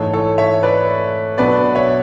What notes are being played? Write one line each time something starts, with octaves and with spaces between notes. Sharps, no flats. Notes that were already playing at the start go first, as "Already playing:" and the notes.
Already playing: G#2 E3 A3 A4 C#5
A4 C#5
C#5 E5
B4 D5
B2 F#3 B3 D4 B4 D5
C#5 E5